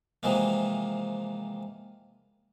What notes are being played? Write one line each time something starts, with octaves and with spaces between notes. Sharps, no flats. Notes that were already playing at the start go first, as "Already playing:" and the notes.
C3 E3 F3 G#3 A#3